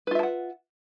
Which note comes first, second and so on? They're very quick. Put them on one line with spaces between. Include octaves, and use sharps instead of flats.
B4 F4 E5 A5 F#5